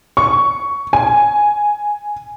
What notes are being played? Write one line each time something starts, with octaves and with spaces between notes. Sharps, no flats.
C#6
G#5